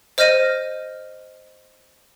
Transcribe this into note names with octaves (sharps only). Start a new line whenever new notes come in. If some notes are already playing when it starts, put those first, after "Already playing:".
C5 D#5 F6 G6 A#6 D#7